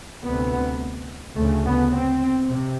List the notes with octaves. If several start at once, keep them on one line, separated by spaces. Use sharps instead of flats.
D2 C3 B3
D2 C#3 A3
B3
C4
C3